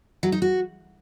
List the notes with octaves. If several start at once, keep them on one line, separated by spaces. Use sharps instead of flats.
F#3
D#4
F#4